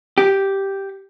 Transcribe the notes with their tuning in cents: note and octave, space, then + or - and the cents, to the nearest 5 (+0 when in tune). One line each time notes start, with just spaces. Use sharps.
G4 -5